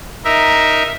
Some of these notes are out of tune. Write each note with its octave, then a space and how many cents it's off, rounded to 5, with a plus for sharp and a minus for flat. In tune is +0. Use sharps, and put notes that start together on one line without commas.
D#4 +0 A#4 +5 E5 -5